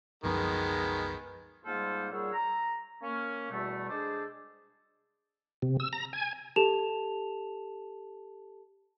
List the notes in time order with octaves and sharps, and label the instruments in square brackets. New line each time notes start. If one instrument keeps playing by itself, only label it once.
[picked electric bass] C2 F#2 F3 [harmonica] D#3 G#3 B3
[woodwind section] G#2 G3 A#3 F4 A4 C5
A#2 G3 G#4 C#5 F#5 E6
A#5
A#3 C#4
E2 B2 G3 A3
G#3 D4 G#4 A4 C5 D5
[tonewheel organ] C3
E6
A#5
G#5
[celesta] G4 A4 A5 E7 F7